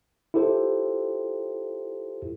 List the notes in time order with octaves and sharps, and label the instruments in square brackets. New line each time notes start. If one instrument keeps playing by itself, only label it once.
[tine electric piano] E4 F4 G4 A4 C5